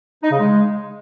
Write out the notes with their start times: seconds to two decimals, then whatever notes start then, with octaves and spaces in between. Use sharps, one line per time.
0.23 D#4
0.31 C#3
0.40 G#3